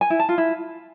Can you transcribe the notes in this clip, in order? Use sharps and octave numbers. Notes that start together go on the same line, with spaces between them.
G#5
E4
A5
F4
E4